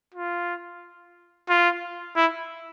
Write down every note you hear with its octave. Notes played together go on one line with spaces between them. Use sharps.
F4
F4
E4